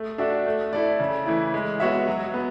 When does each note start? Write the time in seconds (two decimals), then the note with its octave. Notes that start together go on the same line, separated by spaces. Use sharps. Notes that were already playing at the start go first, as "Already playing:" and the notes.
Already playing: A3
0.18 D4 F#4 A4 E5
0.46 A3
0.73 E4 A4 D5
1.00 C#3
1.26 E3 A3 E4
1.54 G#3
1.80 B3 F#4 C#5 E5
2.07 F#3
2.34 B3